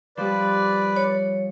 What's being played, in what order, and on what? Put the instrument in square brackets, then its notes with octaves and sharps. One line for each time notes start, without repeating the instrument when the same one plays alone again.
[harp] F3 G3 [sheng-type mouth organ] B4 D5
[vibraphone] C#5